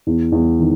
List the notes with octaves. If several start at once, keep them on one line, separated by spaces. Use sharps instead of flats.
E2
E2
D#3